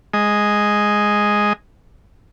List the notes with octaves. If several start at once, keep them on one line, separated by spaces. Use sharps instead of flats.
G#3 D#5